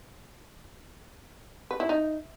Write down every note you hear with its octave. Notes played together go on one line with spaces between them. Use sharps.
B4
E4
D#4